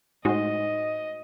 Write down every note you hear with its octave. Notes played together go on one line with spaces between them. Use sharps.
A2 G#3 D#4 F#4 C5 D#5